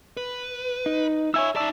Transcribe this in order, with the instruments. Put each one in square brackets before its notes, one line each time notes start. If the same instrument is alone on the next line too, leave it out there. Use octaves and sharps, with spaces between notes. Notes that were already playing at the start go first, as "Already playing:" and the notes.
[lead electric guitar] B4
[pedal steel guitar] D#4
[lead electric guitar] D#4 E5 [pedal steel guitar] C#5 G#5 E6
[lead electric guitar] D#4 D5 [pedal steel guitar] E5 A5 E6